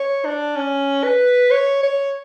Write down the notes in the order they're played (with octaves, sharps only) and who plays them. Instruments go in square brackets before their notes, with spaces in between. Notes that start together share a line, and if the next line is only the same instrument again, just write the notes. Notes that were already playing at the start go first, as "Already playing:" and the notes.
Already playing: [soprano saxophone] C#5
D4
C#4
B4
C#5
C#5